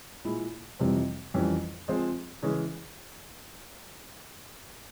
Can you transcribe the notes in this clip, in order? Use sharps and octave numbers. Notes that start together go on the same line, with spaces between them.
A#2 G#3 E4
F2 C3 E3 G3 C4
F2 E3 G3 C#4
F3 G#3 C4 F4 C5
C#3 E3 G#3 C#4